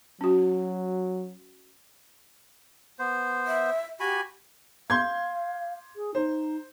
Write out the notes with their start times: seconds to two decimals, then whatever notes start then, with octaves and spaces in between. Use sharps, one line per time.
0.21 F#3 C#4 F#4
2.99 B3 C5
3.47 E5
4.00 F#4 G4 G#5 B5
4.90 F5 C6 G6 G#6
5.96 G#4
6.15 D#4 C5